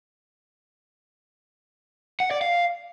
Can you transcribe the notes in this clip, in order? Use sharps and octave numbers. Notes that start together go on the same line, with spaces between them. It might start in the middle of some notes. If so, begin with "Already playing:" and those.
F#5
D5
F5